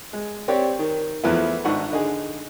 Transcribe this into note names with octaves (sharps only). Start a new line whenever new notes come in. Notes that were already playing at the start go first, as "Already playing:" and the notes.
G#3
C4 G4 C#5 D5
D#3
E2 F3 A3 B3 E4
G#1 G#2 D4 F#5 C#6
D3 D#4 G#4